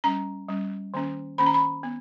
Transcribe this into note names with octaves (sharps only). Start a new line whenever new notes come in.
G3 C#4 A#5
G3 C#4
D#3 A#3 C#4
D#3 A#3 C#4 B5
A#5
B5
B3